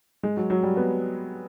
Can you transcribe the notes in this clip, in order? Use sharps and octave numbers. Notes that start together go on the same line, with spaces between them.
G#3
F#3
F#3
G3
B3